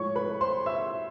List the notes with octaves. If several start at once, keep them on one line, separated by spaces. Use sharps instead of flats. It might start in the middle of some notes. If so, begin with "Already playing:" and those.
Already playing: A2 F3 G#3 C#5 C#6
B4 B5
C5 C6
E5 E6